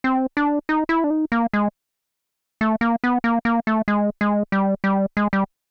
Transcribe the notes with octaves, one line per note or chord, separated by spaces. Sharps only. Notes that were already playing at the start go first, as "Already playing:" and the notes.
C4
D4
D#4
E4
D4
D#4
A#3
G#3
A3
A#3
B3
A#3
A#3
A3
G#3
G#3
G3
G3
G#3
G3